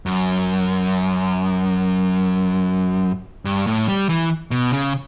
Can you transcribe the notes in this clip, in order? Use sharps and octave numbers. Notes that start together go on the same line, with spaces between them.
F#2
G2
A2
G3
E3
B2
C#3